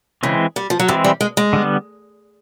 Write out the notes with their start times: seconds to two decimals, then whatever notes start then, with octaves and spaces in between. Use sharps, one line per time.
0.23 C#3 E3 G#3 C4 E4
0.56 G3
0.70 F3
0.79 F#3
0.88 E3 G3 G#3 C4 E4
1.04 G3
1.21 G#3
1.37 G#3
1.53 D3 G3 B3